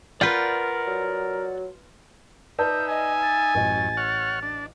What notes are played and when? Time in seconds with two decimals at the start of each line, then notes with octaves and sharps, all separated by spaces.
0.21 F4 A#4 B4 D5 F#5 G6
0.87 F#3
2.59 D#4 B4 D5 E5 A5 G6
2.89 D#5 G#5
3.22 A6
3.55 A1 F#2 D#5
3.97 C#5 F#5 F6
4.43 D4